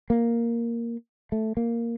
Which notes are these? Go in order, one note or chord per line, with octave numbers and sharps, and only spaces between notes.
A#3
A3
A#3